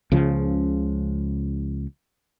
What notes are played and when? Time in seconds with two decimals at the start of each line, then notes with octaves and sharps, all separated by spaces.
0.12 C#2 C#3 F3